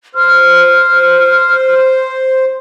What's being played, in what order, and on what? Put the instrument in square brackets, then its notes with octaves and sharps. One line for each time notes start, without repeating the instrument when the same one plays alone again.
[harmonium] C5 [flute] F6